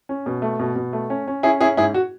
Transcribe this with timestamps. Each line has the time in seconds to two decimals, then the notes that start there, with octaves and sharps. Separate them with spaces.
0.09 C#4
0.26 B2
0.42 A3
0.59 B2
0.76 B2
0.93 A3
1.10 C#4
1.28 C#4
1.43 C#4 E4 G#4
1.61 C#4 E4 G#4
1.77 G#2 E4 G#4
1.94 F#4